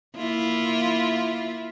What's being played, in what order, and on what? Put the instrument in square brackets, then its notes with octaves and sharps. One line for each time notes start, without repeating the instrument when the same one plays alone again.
[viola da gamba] A#3 E4 F4